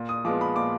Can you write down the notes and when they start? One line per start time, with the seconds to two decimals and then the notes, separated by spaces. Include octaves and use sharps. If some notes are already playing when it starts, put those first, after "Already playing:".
Already playing: A#2
0.09 D#6
0.25 F3 G#3 B3 D6
0.41 B5
0.56 A#2 D6